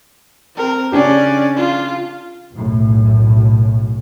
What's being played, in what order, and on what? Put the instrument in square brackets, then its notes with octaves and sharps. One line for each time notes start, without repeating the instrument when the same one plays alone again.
[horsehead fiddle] C4 A#4
[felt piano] C#3 D4 G4 [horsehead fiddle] C#4 D5
[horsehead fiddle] F4
[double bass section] B1 F#2 A2